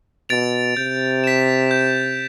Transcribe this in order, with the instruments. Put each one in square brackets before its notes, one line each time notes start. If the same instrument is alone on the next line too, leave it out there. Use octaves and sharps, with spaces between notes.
[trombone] B2 [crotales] A6 D7 F7
[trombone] C3 [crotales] G6
[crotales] B6 E7
G6